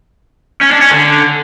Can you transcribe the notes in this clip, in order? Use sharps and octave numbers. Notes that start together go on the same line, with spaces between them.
C#4
D4
C#4
D3